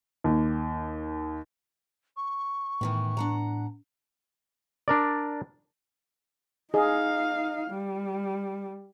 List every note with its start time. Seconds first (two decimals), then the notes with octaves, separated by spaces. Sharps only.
0.24 D#2
2.16 C#6
2.81 A2 D#3 E3 B3
3.17 D4 F#5 A#5
4.88 D4 A#4 D5
6.74 D#4 G#4 D#5 F5
7.71 G3